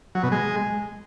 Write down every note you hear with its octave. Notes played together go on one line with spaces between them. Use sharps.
F#3
B2
G#3